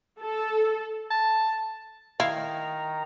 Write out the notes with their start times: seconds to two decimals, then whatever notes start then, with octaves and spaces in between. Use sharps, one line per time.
0.21 A4
1.11 A5
2.20 D#3 E4 F5 A#5